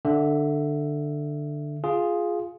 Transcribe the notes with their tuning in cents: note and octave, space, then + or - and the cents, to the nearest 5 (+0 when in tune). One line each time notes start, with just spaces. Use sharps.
D3 +10 E5 +10
F4 +0 G#4 +0